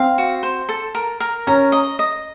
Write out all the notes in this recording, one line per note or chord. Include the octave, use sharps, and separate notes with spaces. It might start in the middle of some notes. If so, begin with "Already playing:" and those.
Already playing: C4 F5
F#4
C5
A4
A#4
A#4
C#4 A#5
D#5
D#5